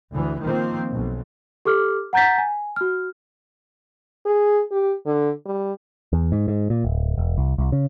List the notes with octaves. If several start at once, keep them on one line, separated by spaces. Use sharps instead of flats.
D2 E3
D#3 F3 A#3 C4
B1
G4 A4 D6 F6
F#5 A#5 G6 A6 B6
G#5
F#4 F6
G#4
G4
D3
G3
E2
G#2
G#2
A#2
D1
E1
C2
C2
C#3